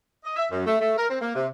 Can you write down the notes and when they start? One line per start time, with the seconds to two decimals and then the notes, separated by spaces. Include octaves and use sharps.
0.24 D#5
0.36 E5
0.50 F#2
0.66 A3
0.80 A3
0.97 A#4
1.09 C4
1.21 A#3
1.35 C3